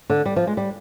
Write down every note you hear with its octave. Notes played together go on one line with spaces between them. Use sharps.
D3
G3
F3
G#3
G3